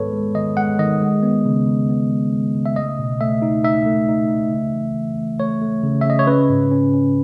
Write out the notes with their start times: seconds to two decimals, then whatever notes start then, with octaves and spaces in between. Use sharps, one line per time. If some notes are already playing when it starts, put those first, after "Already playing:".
Already playing: G#2 D#3 G#3 B3 A4 B4 C#5
0.13 G#3
0.35 D#3 D#5
0.57 G#3 F#5
0.79 D#3 D#5
1.01 G#3
1.23 B3
1.45 C#3
1.66 C#3
1.89 B3
2.11 G#3
2.33 G#3
2.55 C#3
2.66 E5
2.76 A3 D#5
2.99 B2
3.21 A3 E5
3.42 D#4
3.64 D#4 E5
3.86 A3
4.08 D#4
4.31 A3
4.52 C#3
4.74 E3
4.95 E3
5.17 A3
5.40 A3 C#5
5.61 A3
5.83 C#3
6.01 E5
6.06 C#3 D#5
6.19 C#5
6.27 C#4 B4
6.49 G#2
6.71 C#4
6.94 C#4